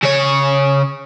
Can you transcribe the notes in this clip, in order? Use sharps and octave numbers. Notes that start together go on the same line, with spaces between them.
C#3 C#5